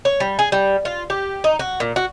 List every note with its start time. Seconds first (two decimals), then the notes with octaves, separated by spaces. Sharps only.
0.05 C#5
0.20 G3
0.39 G#4
0.52 G3
0.85 F4
1.10 G4
1.44 D#4
1.59 F#4
1.80 A#2
1.96 F#4